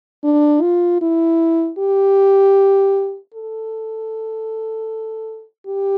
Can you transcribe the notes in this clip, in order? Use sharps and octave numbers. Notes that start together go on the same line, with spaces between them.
D4
F4
E4
G4
A4
G4